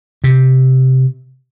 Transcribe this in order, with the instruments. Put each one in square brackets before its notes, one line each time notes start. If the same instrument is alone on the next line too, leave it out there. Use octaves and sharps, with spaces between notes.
[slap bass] C3